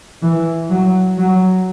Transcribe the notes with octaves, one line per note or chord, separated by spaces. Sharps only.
E3
F#3
F#3